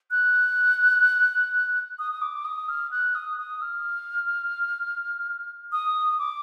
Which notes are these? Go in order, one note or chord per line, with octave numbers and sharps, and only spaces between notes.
F#6
D#6
D#6
D6
D#6
F6
F#6
D#6
D#6
F6
D#6
D6